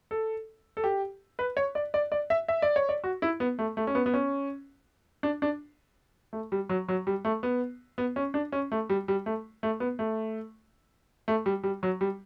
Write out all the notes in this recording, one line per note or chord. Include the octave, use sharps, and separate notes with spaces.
A4
A4
G4
B4
C#5
D5
D5
D5
E5
E5
D5
C#5
D5
F#4
E4
B3
A3
A3
C#4
B3
B3
C#4
D4
D4
A3
G3
F#3
F#3
G3
A3
B3
B3
C#4
D4
C#4
A3
G3
G3
A3
A3
B3
A3
A3
G3
G3
F#3
G3